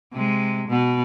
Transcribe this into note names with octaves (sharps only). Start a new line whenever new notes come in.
C3 G#3
B2 B3